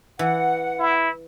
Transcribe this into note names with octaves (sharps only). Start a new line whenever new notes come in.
E3 F#5
E4